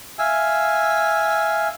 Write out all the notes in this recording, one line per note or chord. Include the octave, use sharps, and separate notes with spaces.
E5 F5 G#5 E6